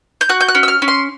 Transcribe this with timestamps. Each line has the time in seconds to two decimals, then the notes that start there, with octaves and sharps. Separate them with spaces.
0.21 G6
0.29 F#4 F#6
0.41 G6
0.48 F#6
0.55 C#4
0.63 E6
0.68 F6
0.82 C#4
0.88 C6